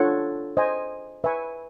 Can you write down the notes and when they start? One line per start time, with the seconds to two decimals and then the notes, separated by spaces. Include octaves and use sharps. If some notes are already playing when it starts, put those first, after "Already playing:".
Already playing: D4 F4 A4 C#5 F#5
0.57 C5 D#5 G#5
1.24 B4 E5 G#5 C#6